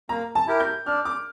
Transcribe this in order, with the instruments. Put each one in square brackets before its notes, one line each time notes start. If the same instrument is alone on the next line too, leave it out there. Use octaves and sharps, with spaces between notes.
[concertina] A#3 [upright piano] A#5
[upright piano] A5
[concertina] E4 G4 A#4
[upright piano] G6
[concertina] D4 [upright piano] F6
[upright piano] D6